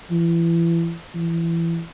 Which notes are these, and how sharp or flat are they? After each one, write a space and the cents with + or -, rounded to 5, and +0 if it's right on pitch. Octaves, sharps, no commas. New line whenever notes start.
E3 +30
E3 +25